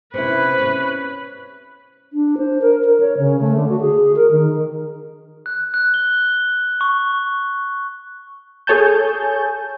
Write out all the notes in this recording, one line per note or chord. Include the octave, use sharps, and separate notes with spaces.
C3 C#4 E4 B4
C#4 C#5
D4
C5
A#4
A#4
C#5
C#3
A3
D3
F#4
G#4
A#4
D#3
F#6
F#6
G7
C#6
G#4 A4 C#5 G#5 A5 G6